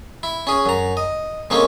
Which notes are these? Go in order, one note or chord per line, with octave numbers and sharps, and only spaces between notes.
E4
C#4 G#4
F#2 A#5
D#5
A2 G#3 A#3 C4 C#4